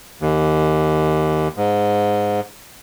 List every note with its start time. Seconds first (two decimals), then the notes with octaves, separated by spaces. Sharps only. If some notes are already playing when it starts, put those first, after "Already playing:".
0.21 D#2
1.57 G#2